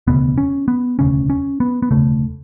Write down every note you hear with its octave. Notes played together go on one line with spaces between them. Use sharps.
E1 D2 C#3 B3
C#4
B3
E1 D2 C#3 C#4
C#4
B3
B3
E1 D2 C#3 A3